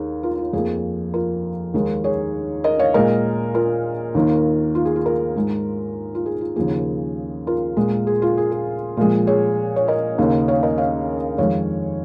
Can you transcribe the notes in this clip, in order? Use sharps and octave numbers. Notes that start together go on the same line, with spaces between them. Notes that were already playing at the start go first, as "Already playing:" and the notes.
Already playing: D#2 D#3 G#4 A#4 C#5
F4 A#4
F4
F2 F3 A#3 G#4
F4 A#4
D#2 D#3 G#3
G#4 C#5
A#4 D#5
C#5 F5
A#2 G#3 A#4 D#5
F4 A#4
D#2 D#3 A#3
F4
G#4
F4
F4 A#4
G#2 G#3
F4
G#4
F4
D#2 C#3 F3 A#3 G#4
F4 A#4
A#2 G#3
G#4
F4
G#4
G#4
A#2 F3 G#3
G#4 C#5
C#5
A#4 D#5
D#2 C#3 A#3
C#5 F5
A#4 D#5
C#5 F5
F2 D#3 G#3 C#5 F5